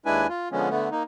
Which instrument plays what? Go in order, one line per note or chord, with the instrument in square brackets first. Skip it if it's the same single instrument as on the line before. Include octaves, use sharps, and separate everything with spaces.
[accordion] D#2 G#3 D4 E4 B4 G#5
F4
D3 F3 G#3 B3 C#4
D3 A3 B3
A#3 D#4